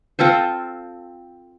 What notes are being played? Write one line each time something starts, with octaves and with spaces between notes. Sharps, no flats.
C4 F4 A4 C5